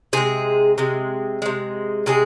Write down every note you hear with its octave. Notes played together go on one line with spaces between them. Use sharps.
C3 G#3 G#4
C3 G#3
C3 G#3
C3 G#3 G#4